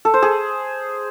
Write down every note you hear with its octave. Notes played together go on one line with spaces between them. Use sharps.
A4
C5
G#4